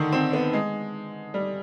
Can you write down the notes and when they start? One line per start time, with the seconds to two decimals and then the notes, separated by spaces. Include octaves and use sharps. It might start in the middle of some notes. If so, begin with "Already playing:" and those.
Already playing: D3 D#3
0.12 C4
0.33 B3
0.53 G#3
1.34 G3